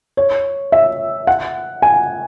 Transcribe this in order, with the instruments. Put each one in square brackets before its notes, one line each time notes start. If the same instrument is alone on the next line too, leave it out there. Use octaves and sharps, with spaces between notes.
[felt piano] C#5
E5
F#5
G#5